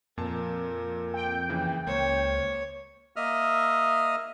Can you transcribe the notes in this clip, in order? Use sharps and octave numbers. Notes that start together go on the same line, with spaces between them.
F2 A#2 A#4 A5
G5
C#3 E3 A#3
C#2 A#3 C5 C#5
A#3 D#5 E5 D#6 F6